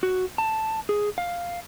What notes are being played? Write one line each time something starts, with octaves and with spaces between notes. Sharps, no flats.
F#4
A5
G#4
F5